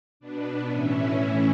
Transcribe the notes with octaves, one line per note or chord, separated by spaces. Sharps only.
B2 B3 D4
A2 E3 C#4 E4